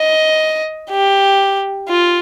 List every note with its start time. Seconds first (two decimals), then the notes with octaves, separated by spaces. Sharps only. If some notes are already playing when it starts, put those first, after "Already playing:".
Already playing: D#5
0.91 G4
1.88 F4